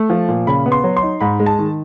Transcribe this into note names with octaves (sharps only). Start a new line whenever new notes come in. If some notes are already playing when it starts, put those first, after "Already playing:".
Already playing: A3
F3
A#2
C#3 B5
B3
C6
F#3
C6
D#4
G#2 B5
G#3
A5
D#3